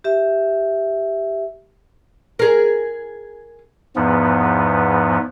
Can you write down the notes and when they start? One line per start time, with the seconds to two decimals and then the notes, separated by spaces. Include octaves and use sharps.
0.04 G4 E5
2.39 G#4 A#4
3.96 E2 G#2 F3 B3